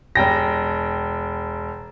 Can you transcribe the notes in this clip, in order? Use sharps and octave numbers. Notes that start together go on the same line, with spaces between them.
E1 G5 A#6